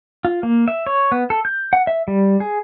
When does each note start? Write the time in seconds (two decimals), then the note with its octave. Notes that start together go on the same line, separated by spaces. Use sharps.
0.25 F4
0.43 A#3
0.68 E5
0.87 C#5
1.12 B3
1.30 A4
1.45 G6
1.73 F#5
1.87 E5
2.08 G3
2.40 G#4